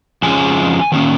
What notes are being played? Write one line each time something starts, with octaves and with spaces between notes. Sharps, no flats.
F2 C#3 F3 G#3 G#5
D#3 A#3 C#4